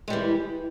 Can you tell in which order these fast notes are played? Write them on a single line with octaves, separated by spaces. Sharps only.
G#3 G3 E3